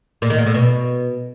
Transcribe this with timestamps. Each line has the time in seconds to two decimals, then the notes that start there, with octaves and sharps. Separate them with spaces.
0.22 A#2
0.30 D#3
0.38 A#2
0.46 A2
0.54 B2